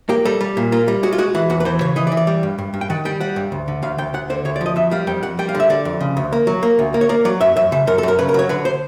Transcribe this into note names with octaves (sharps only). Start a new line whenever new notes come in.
A#3 G4
G3 A4
G3
A#2
A#3 F4
G3
G#3 F#4
F4
G#3 F#4
E3 F#4
E2 F#4
B4
E3 C5
C#3 C#5
E3 D#5
D5
E3
D5
G3
G2
G2
G2
G5
D#3 F#5
G3 G5
G3 F#5
G2
D2
D3
D2 F5
D2 G5
D2 F#5
D3 C5
D2 C#5
D5
F3
D#5
F2 E5
G3 F5
F2 G5
F2 F#5
G3 G5
F5
D3
E5
D3 D5
F2
C#3
D2
A#3
F#3
A#3
D2
A#3
C#5
A#3 D5
F#3 D5
F#2 E5
F#2 E5
C#3 E5
F#2 A#4
A4
F#2 A#4
C#3 B4
A#4
F#3 C#5
D3 B4
C5